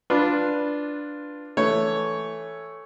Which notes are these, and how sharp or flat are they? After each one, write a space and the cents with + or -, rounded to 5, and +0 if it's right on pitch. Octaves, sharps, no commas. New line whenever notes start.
D4 +0 F4 +0 B4 -5
E3 +0 A3 +0 C#5 +0